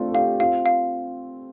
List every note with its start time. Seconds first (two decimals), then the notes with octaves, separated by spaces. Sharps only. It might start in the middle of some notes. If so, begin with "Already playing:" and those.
Already playing: A3 C4 D4 F4
0.08 A4
0.14 D4 G4 F5
0.40 C4 F4 F5
0.66 F5